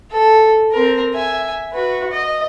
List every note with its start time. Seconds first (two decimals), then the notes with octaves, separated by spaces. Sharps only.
0.11 A4
0.72 C4 A#4
1.14 E5 G#5
1.72 F#4 B4
2.11 D#5